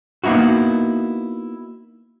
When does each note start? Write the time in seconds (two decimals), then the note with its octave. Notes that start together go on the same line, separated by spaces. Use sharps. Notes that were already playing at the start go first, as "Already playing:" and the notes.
0.24 A#3 B3 D#4 E4 F#4